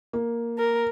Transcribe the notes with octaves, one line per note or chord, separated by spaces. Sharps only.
A#3
A#4